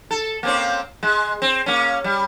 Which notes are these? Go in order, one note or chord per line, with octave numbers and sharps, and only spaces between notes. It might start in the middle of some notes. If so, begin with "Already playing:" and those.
A4
A#3 C4 C#4
G#3
C4
A#3 C#4
G3